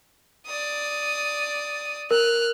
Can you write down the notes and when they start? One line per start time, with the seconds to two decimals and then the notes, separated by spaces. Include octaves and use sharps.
0.46 D5 D#6
2.11 A#4 F6 F#6